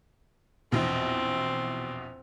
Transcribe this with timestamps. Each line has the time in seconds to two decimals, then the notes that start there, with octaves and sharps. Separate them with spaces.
0.72 A#1 E2 B2 C4